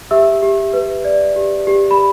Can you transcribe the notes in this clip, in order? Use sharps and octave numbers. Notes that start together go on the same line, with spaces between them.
G4 E5 E6
G4
B4
D5
G4
G4
B5